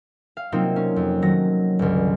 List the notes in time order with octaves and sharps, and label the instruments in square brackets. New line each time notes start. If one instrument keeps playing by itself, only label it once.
[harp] F5
C3 F#3 A#3 C4 D#4 F4
C#4
F2
D#3 F#3 A#6
G1 C#2